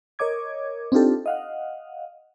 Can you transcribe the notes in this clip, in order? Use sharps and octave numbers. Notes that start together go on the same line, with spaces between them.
A#4 C#5 D#5 D6 G#6
C4 D4 D#4 F4 G4 A4
D#5 F5 F#5